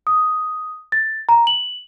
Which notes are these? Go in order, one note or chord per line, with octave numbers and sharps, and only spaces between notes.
D#6
A6
A#5
F#7